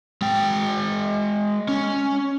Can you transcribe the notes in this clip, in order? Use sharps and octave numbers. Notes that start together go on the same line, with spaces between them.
G#3 G5
C#4